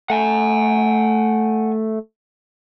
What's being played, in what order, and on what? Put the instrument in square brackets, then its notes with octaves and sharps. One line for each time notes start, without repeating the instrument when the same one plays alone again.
[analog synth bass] A3 [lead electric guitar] F#5 G#5